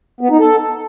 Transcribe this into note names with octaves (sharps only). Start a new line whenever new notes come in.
B3
D#4
A4